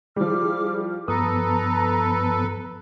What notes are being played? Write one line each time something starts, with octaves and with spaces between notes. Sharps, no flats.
F3 G3 E4 G#4 D6 F6
G2 F3 B3 A4 B4 A#5 D#6